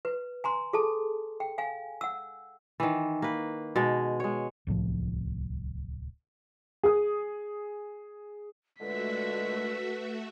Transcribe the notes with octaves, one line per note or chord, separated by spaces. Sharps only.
B4
G#5 A#5 C6
G#4 A4 A5
G5
F5 G#5
F#5 E6
D#3 E3
A#3 B4
B2 G#3
G#3 C#5
D1 C2 A2 F3
G#4 D#6
A#2 D3 G#3 A3 F#4 B4 E5 B6